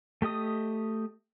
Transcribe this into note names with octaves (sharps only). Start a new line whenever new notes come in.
A3 G4 D#5 D#6